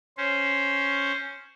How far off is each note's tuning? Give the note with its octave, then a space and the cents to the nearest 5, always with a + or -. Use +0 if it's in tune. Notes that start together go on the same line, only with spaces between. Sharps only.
C#4 +0 C5 +0